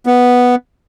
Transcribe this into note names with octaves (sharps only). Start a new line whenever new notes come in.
B3